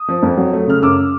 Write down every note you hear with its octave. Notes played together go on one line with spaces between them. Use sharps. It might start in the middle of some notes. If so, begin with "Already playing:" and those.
Already playing: D#6
F3
F2
F#3
A3
C#3 F6
F#2 D6 E6